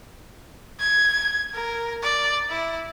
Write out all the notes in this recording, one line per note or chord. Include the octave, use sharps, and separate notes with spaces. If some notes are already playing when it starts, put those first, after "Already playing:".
G#6
A#4
D5
E4